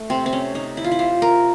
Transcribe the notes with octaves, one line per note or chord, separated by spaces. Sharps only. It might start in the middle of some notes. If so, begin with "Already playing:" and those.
Already playing: A3
C3 C4
C4
C#4
C3 D#4
E4
F4
E4
C3 F4
A#4